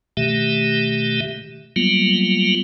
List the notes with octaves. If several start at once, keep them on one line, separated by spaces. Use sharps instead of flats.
B2 D#3 A3 G4 E5
F#3 G3 A#3 B3 F4